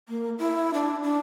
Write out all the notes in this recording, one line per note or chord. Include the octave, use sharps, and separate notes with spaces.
A#3
E4
D4
D4